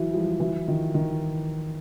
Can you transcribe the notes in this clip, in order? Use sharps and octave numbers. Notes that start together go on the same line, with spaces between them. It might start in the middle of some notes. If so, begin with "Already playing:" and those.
Already playing: E3 F#3
F3 G3
E3 F#3
D#3 F3
D#3